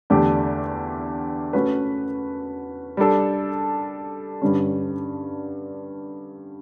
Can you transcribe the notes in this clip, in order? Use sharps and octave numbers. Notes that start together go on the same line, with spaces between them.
E2 D3 A3 D4 G4
A3 C#4 F#4 B4
G3 D4 A4
G2 D3 G3 C#4